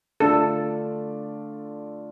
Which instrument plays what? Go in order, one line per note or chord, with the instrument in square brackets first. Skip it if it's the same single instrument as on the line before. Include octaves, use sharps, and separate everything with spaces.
[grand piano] D3 A3 D4 F4 D5 [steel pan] A4